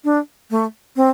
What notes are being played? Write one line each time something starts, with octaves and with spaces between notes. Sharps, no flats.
D4
A3
C4